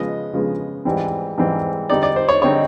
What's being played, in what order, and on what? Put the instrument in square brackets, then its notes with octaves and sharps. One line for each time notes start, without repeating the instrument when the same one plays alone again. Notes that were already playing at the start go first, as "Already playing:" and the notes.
Already playing: [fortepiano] C#3 F3 G#3 B3 D#5
C#3 F3 G#3 B3
G#2 E3 G3 C4
G#2 E3 G3 C4
D3 G3 C4 D#4 D5
D5
C5
C#5
D3 G3 C4 D#4 C#5